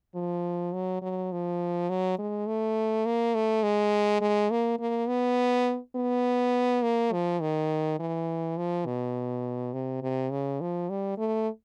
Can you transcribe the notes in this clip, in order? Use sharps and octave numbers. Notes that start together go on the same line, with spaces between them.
F3
F#3
F#3
F3
F#3
G#3
A3
A#3
A3
G#3
G#3
A#3
A#3
B3
B3
A#3
F3
D#3
E3
F3
B2
C3
C3
C#3
F3
G3
A3